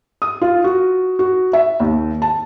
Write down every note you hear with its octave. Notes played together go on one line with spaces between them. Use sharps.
D#6
F4
F#4
F#4
E5
D#2
A5